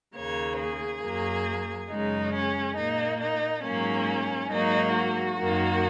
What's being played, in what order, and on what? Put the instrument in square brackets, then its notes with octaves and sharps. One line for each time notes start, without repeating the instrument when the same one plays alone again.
[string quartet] D#2 C#3 A#3 C#5
G#4
F#2 F#3 A#3
F#2 C#3 G#3 D#4
C#4
A#2 A#3 D#4
D#4
G#2 F#3 A#3 C#4
G#2 F#3 A#3 D#4
F#4
F#2 D#3 A#3